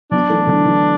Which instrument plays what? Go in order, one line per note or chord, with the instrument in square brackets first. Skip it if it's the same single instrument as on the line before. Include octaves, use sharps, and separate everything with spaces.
[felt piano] F#3 B3 [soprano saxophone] D4
[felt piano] E3 A3
D3 F#3
E3